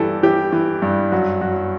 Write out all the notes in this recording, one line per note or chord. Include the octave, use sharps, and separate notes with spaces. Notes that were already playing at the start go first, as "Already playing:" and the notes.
Already playing: G2 E3 G4 A4
E3 G4
E3
G2
F#2 F#4
F#2 F#4